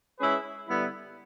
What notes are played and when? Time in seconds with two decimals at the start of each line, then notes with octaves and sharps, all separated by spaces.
0.19 G#3 C#4 E4 G#4 B4
0.68 D3 G3 B3 E4